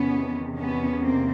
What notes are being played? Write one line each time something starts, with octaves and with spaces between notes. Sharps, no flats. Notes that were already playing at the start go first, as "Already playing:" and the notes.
Already playing: E2 C3 D#3 B3 C#4
B3 C#4
A#3 C4